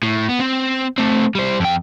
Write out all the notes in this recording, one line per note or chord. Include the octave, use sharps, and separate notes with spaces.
A2
B3
C4
A3 C4
G3 C5
F2 G5